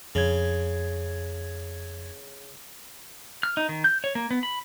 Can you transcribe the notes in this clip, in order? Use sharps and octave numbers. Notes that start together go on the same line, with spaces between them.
F2 C#3 G#6
F6
D#4
D#3
G6
C#5
A#3
B3
B5